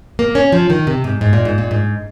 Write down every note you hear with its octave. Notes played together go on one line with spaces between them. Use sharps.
A#3
C#4
F3
D#3
C3
G#2
G#2
A#2
G#2
A#2
G#2